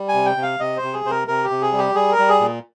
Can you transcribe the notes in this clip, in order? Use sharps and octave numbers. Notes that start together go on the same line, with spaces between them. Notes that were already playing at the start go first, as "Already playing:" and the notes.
Already playing: G3
G#5
C3
G5
C3
F5
C3 D#5
C5
C3
G#4
C3 C5
A#4
C3 A#4
G4
C3
G#4
G3
G4
G3 G#4
A#4
G3
G#4
A#2